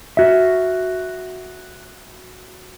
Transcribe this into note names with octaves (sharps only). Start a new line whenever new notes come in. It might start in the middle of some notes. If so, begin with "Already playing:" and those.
F#4 E5